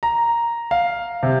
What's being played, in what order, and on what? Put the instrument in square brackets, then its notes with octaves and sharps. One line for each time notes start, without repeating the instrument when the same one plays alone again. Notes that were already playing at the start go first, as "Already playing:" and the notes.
[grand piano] A#5
F5
C3